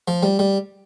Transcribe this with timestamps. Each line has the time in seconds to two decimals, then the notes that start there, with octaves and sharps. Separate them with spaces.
0.08 F3
0.23 G3
0.39 G3